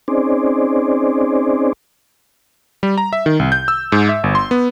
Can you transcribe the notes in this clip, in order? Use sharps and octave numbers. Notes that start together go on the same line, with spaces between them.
C4 C#4 D#4 G#4 C5 D5
G3
A#5
E5
D#3
C2
G6
E6
G#2
E5
G1
C6
B3